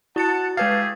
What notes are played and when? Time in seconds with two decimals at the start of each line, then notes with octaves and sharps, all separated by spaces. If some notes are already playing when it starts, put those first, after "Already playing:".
0.16 E4 F#4 F#5 A5 A6 C#7
0.57 G#3 A3 G4 G#4 B4 F5 A6